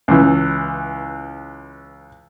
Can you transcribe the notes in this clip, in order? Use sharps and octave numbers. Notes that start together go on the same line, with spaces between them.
C#2 E3